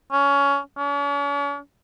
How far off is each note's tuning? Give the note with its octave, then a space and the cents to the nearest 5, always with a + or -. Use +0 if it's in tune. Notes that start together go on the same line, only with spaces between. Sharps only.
C#4 +20
C#4 +45